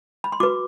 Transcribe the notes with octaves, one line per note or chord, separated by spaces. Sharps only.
B5
C6
F#4 B4 D6